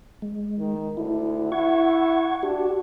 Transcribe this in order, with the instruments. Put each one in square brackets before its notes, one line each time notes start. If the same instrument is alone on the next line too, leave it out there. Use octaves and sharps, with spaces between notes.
[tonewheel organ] G#3
[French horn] D#3
[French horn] D2 [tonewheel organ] E4
[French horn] E4 [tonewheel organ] F#5 C#6 G#6
[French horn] D4 [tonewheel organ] F#4 G4